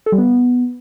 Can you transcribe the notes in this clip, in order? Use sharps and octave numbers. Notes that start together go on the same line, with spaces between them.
A4
G3
B3